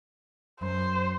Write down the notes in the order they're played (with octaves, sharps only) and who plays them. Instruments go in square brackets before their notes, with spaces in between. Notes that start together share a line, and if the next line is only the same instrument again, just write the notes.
[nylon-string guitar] F#2 [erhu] C5